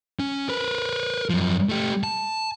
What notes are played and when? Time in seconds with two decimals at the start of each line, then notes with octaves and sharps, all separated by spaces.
0.20 C#4
0.49 A#4 B4
1.30 F#2 F3
1.69 A3 G4
2.03 A5